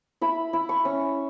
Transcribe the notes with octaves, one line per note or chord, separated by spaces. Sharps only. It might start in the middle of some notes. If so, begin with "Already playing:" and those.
E4 B5
E4
C#6
C#4